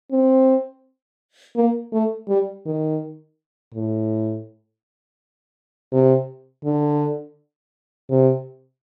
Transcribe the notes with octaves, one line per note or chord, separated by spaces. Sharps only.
C4
A#3
A3
G3
D#3
A2
C3
D3
C3